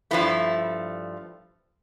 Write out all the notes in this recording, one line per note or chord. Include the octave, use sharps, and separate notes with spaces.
G2 F3 A3 E4